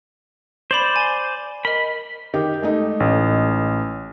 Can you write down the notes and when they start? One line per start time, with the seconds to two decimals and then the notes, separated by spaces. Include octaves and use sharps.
0.71 C5 D5 B5 F7 F#7
0.96 G#5
1.65 A#4 D#5 B5
2.34 D#3 G4
2.62 G#3 A3 D#4
3.00 A1